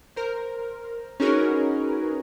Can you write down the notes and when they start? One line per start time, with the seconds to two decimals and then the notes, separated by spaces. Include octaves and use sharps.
0.16 A#4 C5
1.20 C#4 D#4 F#4 G#4 A#4 B4